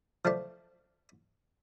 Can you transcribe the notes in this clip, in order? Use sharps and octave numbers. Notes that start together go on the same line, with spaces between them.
F3 A3 D4 A5